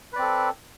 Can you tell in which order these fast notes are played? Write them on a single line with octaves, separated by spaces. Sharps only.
B4 D5 C4 A4